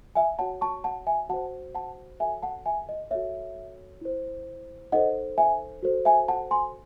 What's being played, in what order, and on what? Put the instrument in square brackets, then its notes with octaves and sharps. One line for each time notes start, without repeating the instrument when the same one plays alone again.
[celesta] E5 G#5
F#4 C#5 F#5 A5
A5 C#6
F#5 A5
E5 G#5
F#4 C5 F#5 A5
F#5 A5
F#4 A4 C#5 E5 G#5
F#5 A5
E5 G#5
D#5
F#4 A4 C#5 E5
E4 C5
D#4 A4 C5 D#5 F#5
E5 G#5
F#4 A4 C5
E5 G#5
F#5 A5
G#5 C6